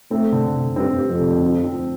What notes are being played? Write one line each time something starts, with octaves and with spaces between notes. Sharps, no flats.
A3 C4
D3
D3
G2 C4
G4
F2
D3
F3
C4